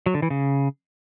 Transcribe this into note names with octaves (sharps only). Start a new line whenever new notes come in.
F#3
D3
E3
C#3